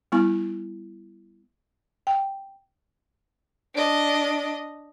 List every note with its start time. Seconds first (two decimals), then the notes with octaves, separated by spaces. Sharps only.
0.12 G3 B3 E4 G#5
2.07 G5
3.75 D4 D#5